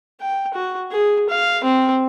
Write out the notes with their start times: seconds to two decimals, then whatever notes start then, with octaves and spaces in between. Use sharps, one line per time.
0.21 G5
0.53 F#4
0.92 G#4
1.29 F5
1.64 C4